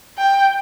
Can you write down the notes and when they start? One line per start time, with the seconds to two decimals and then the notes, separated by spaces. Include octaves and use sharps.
0.17 G5